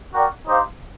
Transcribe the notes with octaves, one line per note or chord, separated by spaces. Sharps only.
F#4 A#4 D5 G5
D#4 G4 C5 F5